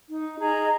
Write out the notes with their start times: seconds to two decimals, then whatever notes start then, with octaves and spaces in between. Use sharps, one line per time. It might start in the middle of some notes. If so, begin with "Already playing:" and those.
0.10 D#4
0.39 G#4 D#5 A#5